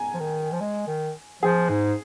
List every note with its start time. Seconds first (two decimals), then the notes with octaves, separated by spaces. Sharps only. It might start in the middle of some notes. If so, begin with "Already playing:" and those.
Already playing: G#5 A#5
0.14 F3
0.20 D#3
0.52 F3
0.61 G#3
0.87 D#3
1.43 F3 G#4
1.69 G#2